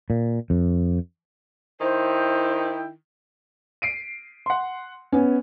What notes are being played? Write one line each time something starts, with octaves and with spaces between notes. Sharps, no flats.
A#2
F2
D#3 E4 C5 G5
C7 D7 D#7
F#5 C6
B3 C#4 G#5